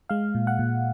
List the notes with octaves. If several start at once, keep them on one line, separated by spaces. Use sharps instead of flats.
G#3 F5
A#2
F#5
A#2